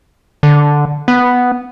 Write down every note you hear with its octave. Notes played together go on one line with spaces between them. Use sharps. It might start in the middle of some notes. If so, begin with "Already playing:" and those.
D3
B3